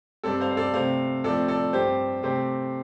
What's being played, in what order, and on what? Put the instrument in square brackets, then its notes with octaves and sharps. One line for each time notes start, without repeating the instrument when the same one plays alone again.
[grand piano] G2 G3 C4 A4 D5
C5 F5
C5
A4 D5
C3 A3 C4 C5 F5
A2 F3 A3 C4 A4 D5
A4 D5
G2 G3 C4 G4 C5
C3 A3 C4 G4 C5